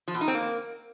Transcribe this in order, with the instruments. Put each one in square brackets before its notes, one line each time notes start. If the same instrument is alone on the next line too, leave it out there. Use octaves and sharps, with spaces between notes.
[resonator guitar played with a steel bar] F3
B2
D#4
C4
A#3